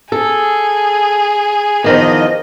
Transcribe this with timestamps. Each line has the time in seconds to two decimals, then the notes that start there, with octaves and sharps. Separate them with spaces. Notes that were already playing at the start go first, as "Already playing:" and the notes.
0.12 G#4 A4
1.84 E2 D#3 F3 D#5